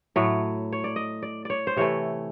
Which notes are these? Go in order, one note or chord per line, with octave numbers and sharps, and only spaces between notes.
A2 F#3 A3 C#5
C#5
D5
D#5
D5
C#5 D5
C5
C3 E3 A3 C#5